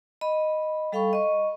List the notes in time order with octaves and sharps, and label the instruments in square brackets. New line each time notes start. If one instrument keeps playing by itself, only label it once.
[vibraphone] D#5 B5
G3 A4 F5 G5 B5 C#6
D#5 C#6